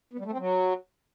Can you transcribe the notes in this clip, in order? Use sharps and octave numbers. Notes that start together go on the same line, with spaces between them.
B3
G3
A3
C4
F#3